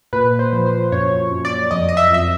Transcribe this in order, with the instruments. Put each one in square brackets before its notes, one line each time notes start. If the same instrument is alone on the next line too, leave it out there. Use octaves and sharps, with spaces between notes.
[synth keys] A#2 B4
C5
F3
C5
F#2 C#5
F#2
D5
F2 D#5
D#5
E5
F2 E5